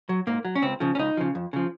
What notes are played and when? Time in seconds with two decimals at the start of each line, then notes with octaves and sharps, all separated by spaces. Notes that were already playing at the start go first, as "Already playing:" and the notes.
0.09 F#3
0.27 G#2 A#3
0.45 F#3
0.55 C#4
0.62 C#2 C4
0.80 C#3 F3
0.95 C#4
0.99 C#2 D#4
1.17 C#3 F3
1.35 F2
1.53 C#3 F3